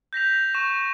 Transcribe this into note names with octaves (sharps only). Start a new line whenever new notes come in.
G6 A#6 B6 F7
C#6 E7